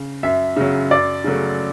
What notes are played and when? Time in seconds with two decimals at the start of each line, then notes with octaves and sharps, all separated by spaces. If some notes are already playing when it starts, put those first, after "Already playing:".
Already playing: C#3
0.23 F#2 E5
0.56 C#3 F#3
0.91 F#2 D5
1.24 C#3 F#3 A3